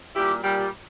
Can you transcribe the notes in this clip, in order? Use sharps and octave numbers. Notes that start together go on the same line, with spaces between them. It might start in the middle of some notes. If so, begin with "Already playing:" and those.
A#2 G3 E4 G4
A#2 G3